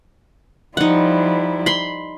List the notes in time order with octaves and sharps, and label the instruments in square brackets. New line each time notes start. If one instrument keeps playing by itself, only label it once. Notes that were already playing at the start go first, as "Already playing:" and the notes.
[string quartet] F3 G3 E4 [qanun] D#4 F#5
[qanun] B5 C6